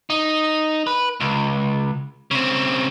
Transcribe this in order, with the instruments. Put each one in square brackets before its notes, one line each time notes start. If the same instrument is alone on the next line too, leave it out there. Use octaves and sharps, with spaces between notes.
[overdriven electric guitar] D#4
B4
C#2
C#3 C4